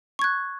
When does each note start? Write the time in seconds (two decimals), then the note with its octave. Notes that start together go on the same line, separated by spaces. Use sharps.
0.19 C#6
0.22 G#6
0.24 F#6